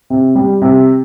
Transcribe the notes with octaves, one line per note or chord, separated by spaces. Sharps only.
C3
G3
C3